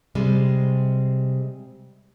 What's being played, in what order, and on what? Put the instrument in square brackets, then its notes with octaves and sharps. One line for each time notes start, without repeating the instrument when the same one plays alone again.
[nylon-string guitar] C3 G3 G#3